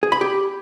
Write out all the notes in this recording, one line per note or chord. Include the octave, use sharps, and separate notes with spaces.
G#4
B5
G4